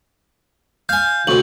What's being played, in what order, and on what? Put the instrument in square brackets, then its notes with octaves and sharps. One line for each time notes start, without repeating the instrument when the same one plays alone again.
[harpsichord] F5 G#5 [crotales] G6
[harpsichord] D2 C3 [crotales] C#6 F#7